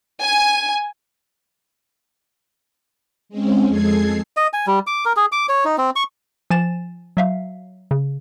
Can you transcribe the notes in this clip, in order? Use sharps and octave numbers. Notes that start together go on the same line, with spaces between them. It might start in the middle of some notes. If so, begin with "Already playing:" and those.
G#5
G#3 C4 C#4
F2 G#3 G#4 A4 G#6 C7
D#5
G#5
G3
D6
A#4
G#4
D6
C#5
D#4
C4
C#6
F3 G#5 A6 E7
F#3 E5 F5
C#3